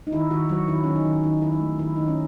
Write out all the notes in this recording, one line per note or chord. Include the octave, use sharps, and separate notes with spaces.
D#4
D#3 E4
D#3 F#4
F#3 F#4
D#3 E4
D#3 C#4
D#4
D#3
D#3 D#4
D#3 E4
D#4
A3
D#3 E4
D#3 D#4
C#4